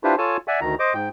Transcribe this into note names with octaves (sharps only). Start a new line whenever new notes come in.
D4 E4 F4 G4 B4 C5
F4 A4 C#5 G#5 A5
D5 E5 F#5 G#5
D2 D#3 A#5
C5 D#5 D6
G#2 G5